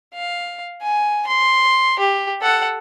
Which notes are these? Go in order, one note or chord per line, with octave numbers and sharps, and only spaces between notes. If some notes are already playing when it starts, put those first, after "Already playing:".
F5
G#5
C6
G4
A4 F#5